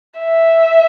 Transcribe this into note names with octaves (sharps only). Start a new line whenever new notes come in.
E5